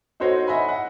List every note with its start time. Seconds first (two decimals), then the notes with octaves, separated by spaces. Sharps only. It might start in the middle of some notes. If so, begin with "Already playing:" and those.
0.20 D#4 F#4 A4 C5 C#5 D#5
0.47 D#5 E5 F#5 G#5 B5
0.69 F#5